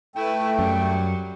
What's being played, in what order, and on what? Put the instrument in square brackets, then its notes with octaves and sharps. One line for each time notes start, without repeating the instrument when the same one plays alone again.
[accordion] A3 [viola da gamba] E4 B4 [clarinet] G5
[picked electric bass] F#2 [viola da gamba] F#3 G3